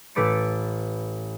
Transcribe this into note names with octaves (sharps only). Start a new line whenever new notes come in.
A1 A3 B4 D6 A6 C#7